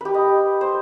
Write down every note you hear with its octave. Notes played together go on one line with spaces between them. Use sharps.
G4 B4
D#5
C5